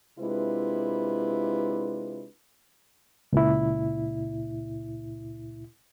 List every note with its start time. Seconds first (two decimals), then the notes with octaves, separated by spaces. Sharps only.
0.19 C3 G#3 D4 E4 F4 B4
3.33 C#2 A#2 E4